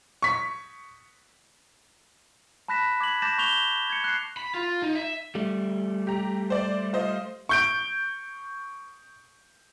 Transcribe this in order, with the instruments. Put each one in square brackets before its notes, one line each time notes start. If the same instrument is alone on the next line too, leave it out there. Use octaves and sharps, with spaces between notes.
[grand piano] C#6 B6
[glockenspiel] A5 B5 F#6 A#6 B6 E7
D6 G#6 B6 F#7
A5 D6 G6 A6 A#6 E7
C#6 G6 F7 G7
G#6 C#7
F#6 C7
[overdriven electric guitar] B5
F4
D#4
E5
[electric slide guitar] G3 A3
[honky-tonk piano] G4 A#5
C5 D5
F4 C5 D#5
[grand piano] C#6 G6 D7